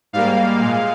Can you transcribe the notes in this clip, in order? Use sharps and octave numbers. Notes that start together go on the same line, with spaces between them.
G#2 G3 A#3 F5
A#2 G#3